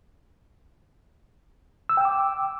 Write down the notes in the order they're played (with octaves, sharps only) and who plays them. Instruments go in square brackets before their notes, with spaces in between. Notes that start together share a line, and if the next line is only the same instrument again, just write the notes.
[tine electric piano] E6
G5
D6